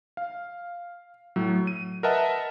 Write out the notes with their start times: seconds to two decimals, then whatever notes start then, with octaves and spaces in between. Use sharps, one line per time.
0.17 F5
1.36 A2 F#3
1.67 D#7
2.03 A#4 B4 D#5 E5 F#5 A5